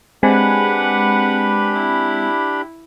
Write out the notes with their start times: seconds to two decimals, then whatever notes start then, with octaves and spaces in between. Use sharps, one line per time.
0.23 G#3 C4 D4 G4 B4 F#5 G#5 B5
1.74 E4